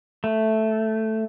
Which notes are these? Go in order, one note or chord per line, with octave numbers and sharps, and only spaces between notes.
A3